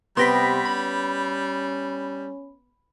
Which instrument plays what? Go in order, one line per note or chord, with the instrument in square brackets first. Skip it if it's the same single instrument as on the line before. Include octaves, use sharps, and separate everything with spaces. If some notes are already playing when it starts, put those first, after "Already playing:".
[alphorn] C3 [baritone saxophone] G3 [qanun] B3 G5 [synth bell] C6 A#6 B6
[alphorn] C#4 [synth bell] B5